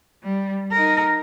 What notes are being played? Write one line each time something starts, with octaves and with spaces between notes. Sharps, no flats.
G3
D#4 A#4